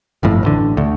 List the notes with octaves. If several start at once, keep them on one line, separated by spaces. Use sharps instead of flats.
G1 F2 A2
A1 D3
D2